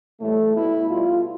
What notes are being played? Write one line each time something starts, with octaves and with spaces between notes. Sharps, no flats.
A2 E3 G3 A3
B2 G3 E4
B2 G3 F4